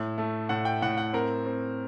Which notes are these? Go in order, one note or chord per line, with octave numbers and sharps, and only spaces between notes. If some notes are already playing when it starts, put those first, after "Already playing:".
Already playing: A2
A3
A2 F#5
G5
A2 F#5
F#5
C4 A#4
C4